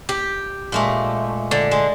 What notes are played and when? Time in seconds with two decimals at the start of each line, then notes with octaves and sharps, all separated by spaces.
0.09 G4
0.72 A#2 G#3 A3
1.51 D3
1.71 G#3